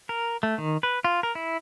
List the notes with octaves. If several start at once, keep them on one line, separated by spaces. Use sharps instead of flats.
A#4
A3
D#3
B4
F4
A#4
E4